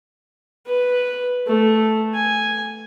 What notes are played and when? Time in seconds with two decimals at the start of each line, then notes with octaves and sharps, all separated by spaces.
0.66 B4
1.47 A3
2.14 G#5